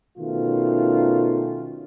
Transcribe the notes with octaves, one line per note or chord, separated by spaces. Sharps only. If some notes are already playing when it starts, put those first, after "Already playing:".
B2 D#3 A3 C#4 F4